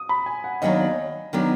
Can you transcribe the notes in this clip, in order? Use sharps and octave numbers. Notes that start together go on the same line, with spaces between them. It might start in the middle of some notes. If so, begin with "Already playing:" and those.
Already playing: D#6
B5
G#5
F#5
D#2 D#3 F#3 B3 D4 D#5
D#3 F#3 B3 D4